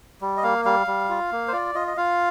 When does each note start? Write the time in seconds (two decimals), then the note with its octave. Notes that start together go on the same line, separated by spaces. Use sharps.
0.21 G3
0.37 D#5
0.43 A#3 F5
0.65 G3 F5
0.87 G3
1.09 F4
1.32 A#3
1.48 C5
1.53 F4 D5
1.75 F4 D#5
1.87 D#5
1.97 F4 F5